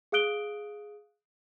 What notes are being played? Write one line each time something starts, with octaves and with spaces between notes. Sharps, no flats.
G#4 F5 D#6 F#6 D7 G7